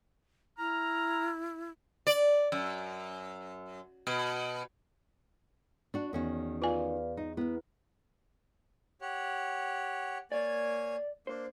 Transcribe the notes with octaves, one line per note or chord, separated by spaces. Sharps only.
E4 A#5 F6
D5
F#2
B2
D4 F#4
E2 D#3 C#4 F#4
F4 B4 D5 F5 G#5
D#4
B3 E4 B4
G4 C#5 F#5
A#3 C#5 D5 G#5
A#3 D4 C5